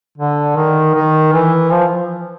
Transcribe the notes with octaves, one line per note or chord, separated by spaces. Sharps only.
D3
D#3
D#3
E3
F3